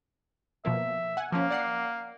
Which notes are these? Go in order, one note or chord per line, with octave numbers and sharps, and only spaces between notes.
B2 F3 A#3 E5
F#5 G#5
F3 A#3 C#4
D5 F#5 C7